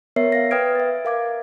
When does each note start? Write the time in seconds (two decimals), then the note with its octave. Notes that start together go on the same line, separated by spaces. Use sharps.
0.16 B3 A#4 C#5 E5 C7
0.32 F5 A#6
0.51 B4 G5 D#6 F6 G#6 D7
0.75 E5 A6
1.05 A#4 F5 D6 G#6